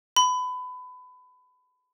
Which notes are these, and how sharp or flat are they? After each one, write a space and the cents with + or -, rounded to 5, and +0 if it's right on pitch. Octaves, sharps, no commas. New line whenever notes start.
B5 +25